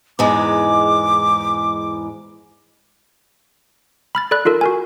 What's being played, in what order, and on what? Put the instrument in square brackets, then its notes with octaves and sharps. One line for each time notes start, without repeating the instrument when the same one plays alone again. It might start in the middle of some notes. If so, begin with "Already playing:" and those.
[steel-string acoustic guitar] E2 G#2 G#3 [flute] D6
[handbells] B5 F6 A6
A4 D5 B5 F#6
D#4 F4 A4 A#4
F#4 A#4 G#5